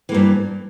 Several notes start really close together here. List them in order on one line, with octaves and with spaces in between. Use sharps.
E3 A#3 G2